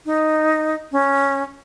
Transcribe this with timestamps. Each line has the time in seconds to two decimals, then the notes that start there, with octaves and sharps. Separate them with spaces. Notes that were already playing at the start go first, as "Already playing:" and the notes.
0.06 D#4
0.92 C#4